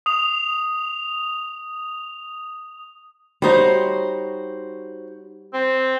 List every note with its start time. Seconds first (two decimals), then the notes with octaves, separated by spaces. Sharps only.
0.06 D#6 F7
3.42 G3 D#4 F#4 C5 C#5
5.53 C4